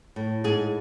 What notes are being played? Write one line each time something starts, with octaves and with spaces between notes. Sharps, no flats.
A2
G#2 G#4